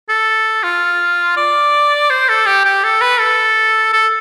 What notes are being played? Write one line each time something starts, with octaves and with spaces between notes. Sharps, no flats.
A4
F4
D5
C5
A4
G4
G4
A4
B4
A4
A4